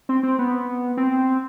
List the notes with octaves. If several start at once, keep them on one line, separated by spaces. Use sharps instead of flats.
C4
C4
B3
C4